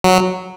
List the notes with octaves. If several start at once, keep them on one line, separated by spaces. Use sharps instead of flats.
F#3